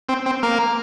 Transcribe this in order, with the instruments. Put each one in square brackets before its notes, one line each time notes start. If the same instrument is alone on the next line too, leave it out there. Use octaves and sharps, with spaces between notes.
[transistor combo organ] C4
C4
A#3